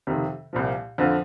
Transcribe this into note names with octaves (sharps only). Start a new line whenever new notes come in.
F2 C3 D#3
C2 A#2 F3
F2 D3 F3